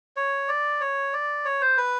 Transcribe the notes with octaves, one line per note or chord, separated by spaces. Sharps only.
C#5
D5
C#5
D5
C#5
C5
B4